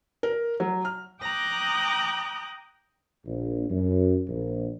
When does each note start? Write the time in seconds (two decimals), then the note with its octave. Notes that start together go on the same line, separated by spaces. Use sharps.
0.23 A#4
0.60 F#3
0.85 F6
1.22 G5 A#5 D6 D#6 F#6 G6
3.26 A#1
3.69 F#2
4.27 A#1